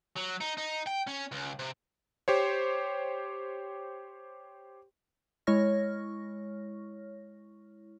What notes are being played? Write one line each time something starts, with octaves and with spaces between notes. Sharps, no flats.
F#3
D#4
D#4
G5
C#4
C#2
C3
G4 C5 C#5
G#3 E4 C#5 C#6 F6 A#6